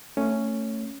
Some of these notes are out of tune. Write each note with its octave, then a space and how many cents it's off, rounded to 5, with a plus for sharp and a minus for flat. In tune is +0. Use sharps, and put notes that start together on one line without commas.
A3 +25 C#4 +0